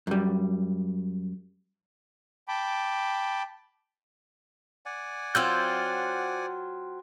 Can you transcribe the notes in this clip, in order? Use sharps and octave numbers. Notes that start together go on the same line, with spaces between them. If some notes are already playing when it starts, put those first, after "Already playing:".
F#2 G3
G5 A5 B5 D6
D5 F#5 G#5
F#3 C4 F4 C5 E6 G6